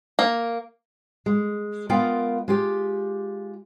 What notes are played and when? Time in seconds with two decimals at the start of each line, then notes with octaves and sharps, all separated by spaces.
0.19 A#3
1.26 G#3
1.89 G#3 B3 F4 A#4 F5 G5
2.48 G#3 F4 G4